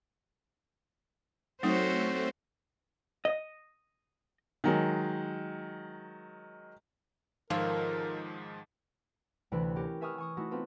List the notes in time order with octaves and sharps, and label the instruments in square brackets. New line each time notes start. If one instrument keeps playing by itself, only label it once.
[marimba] F#3 D#4 [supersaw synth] A3 C4 [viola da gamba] C#4 F#4 C5
[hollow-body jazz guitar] D#5
[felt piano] D#3 F#3 G#3
[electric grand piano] G#2 D#3 F3 [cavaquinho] F4 A4 C#5 [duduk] A#4
[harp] D2 C3 E3 D4 B4 F#6
C#4 G4 A#4
B4 E5 G#5 C#6 D#6 F6
G#5 C#6 D#6
A3 D#4 E4 F#4
B3 C4 D#4 F4 A4 B4